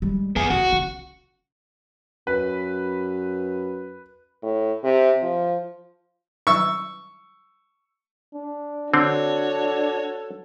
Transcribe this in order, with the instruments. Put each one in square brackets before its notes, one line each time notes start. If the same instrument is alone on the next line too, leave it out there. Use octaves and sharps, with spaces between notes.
[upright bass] G3 G#3
[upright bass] F2 [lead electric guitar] B3 G#4
[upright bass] C2 [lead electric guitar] F#4
[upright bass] C#3
[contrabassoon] F#2 [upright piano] B4
[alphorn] A2
C3
F3
[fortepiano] C#6 E6
[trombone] D4
[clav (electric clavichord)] D3 C4 [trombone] D4 [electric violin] F#4 C#5 [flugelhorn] A4